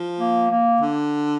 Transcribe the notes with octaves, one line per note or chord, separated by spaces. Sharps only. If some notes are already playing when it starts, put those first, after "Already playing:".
Already playing: F3
A#3
A#3
D3